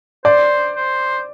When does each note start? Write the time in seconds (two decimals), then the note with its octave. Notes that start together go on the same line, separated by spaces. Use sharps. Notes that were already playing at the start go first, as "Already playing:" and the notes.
0.25 C5 D5
0.76 C5